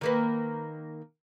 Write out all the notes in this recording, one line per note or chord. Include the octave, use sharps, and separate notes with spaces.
D#3 A#3 B4